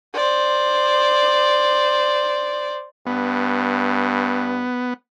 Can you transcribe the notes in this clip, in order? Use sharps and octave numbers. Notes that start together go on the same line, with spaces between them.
C5 D5
G2 B3